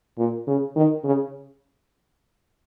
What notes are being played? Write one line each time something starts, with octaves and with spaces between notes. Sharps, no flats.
A#2
C#3
D#3
C#3